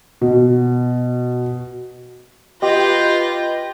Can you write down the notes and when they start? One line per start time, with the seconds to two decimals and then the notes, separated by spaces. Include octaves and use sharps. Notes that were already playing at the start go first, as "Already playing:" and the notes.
0.21 B2
2.62 F4 G4 B4 D#5 G6 A#6